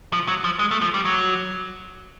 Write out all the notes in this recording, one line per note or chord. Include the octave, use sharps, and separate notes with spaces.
F3
F#3
F3
G#3
A3
F3
G3
F#3